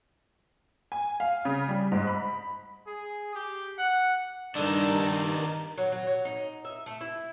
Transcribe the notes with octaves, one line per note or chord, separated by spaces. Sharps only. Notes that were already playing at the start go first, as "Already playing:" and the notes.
G#5
F5
C#3
G3
G#2
B5
G#4
G4
F#5
G2 D3 D#3 D4 D#4 A#4
F#3
F#3
F#3
D#4
E5
A3
E4